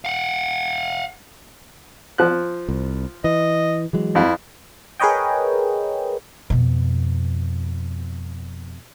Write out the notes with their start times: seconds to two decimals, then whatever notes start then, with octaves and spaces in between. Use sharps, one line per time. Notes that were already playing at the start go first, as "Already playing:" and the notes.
0.05 F5 F#5
2.18 F3 F#6
2.69 C2
3.24 E3 D#5
3.93 E3 F#3 G#3
4.15 F2 E4
5.00 G#4 A#4 B4 C#5 D#5 G5
6.50 F2 B2